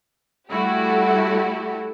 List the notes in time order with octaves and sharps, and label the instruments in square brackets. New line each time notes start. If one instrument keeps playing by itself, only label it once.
[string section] G3 A3 E4 F#4 G4